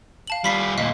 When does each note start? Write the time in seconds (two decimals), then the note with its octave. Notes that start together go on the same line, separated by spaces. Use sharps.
0.27 F5 A5 F#7
0.44 G3 F4 B5 B6 C7
0.78 D2 A#2 D#5 F5 B6